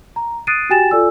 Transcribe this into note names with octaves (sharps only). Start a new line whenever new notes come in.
A#5
D#6 F#6 A6 C7 D7 D#7
F#4 G4 G5 G#5 A6 E7
F4 A4 D5 G#5 E6